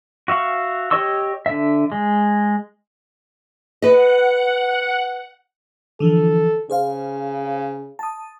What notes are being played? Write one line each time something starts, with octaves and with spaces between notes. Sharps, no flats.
F#4 E5 F5 C#6
G4 C#5 D#5 C#6 E6
D3 E5
G#3
B4 D#5 F#5
D3 E3 F3 A4
C#3 G#4 C5 F5
A5 D#6